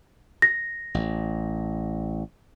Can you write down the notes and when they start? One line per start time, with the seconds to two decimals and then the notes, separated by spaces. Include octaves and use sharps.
0.42 A#6
0.94 A1